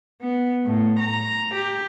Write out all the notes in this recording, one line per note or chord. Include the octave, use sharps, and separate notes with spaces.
B3
A2
A#5
G4